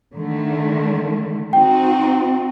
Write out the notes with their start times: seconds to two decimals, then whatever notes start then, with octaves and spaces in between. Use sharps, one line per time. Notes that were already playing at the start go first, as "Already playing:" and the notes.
0.13 D3 D#3 A3
1.53 C4 D#4 F#4 G5